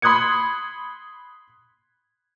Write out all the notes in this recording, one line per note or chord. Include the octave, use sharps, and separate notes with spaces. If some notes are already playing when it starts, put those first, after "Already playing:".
B5 C6 D#6 F#6 G#6 C#7